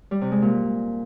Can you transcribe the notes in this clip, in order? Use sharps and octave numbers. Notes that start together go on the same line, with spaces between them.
G3
C3
G#3
A#2